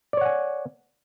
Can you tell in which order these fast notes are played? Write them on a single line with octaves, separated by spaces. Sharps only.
D5 C#5 F#5 G#5